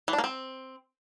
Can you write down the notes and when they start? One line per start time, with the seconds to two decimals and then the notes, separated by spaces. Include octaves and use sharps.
0.08 E3
0.13 D4
0.18 A#3
0.24 C4